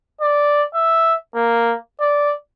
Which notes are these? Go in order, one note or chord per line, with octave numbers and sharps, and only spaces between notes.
D5
E5
A#3
D5